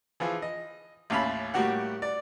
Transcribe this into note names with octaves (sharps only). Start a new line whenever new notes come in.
E3 F3 F4 G#4
D#5
A1 D#2 C#4 F5 A5 B5
A2 G3 A#3 F#4 G4 F#5
D5